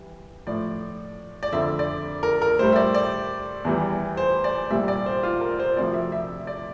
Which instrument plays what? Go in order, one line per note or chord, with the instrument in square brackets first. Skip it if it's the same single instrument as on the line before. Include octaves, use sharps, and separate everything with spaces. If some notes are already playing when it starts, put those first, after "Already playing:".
Already playing: [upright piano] E3 G3
A2 F3 D5
D5
F2 D3 F3 E5
D5
A#4
A#4
A2 G3 C5
E5
D5
D5
E2 E3 G3
C5
D5
C2 A#2 G3 E5
D5
C5
F4
A#4
C5
D2 C3 F3 D5
E5
E5
D5